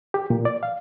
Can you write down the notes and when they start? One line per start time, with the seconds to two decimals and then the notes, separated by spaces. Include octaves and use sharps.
0.14 G4
0.30 A#2
0.45 D5
0.63 F5